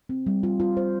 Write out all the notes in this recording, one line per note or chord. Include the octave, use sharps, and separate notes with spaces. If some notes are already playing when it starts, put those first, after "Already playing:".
C4
G3
F4
F4
C5